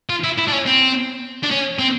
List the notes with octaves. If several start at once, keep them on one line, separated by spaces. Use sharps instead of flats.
F4
E4
E4
D4
C#4
C4
D4
C#4
C4